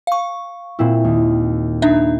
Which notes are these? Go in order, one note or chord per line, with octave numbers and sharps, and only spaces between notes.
F5 C#6
A#2 C4 E4
D#2
D4 D#4 E5